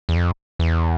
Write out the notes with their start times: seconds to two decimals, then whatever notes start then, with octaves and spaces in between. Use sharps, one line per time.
0.09 E2
0.16 F2
0.59 E2